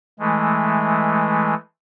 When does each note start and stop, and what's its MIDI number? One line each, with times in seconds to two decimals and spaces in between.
0.19 1.54 52
0.19 1.54 56
0.19 1.54 57